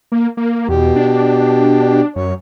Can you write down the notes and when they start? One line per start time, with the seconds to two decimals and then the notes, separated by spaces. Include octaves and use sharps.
0.12 A#3
0.37 A#3
0.69 E2 B2 G4
0.96 D4
2.16 F#2 C#5